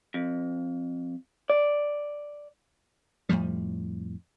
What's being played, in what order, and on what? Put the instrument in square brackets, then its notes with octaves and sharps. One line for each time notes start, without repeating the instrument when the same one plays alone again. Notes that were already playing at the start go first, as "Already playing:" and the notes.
[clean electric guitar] F2
D5
[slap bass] F2 A2 F3 G3